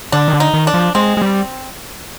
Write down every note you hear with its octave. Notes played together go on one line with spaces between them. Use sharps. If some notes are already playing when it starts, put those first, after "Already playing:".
D3 D4
D#3
D3
D#4
D#3
D4
F3
G#3 C4
G#3
G3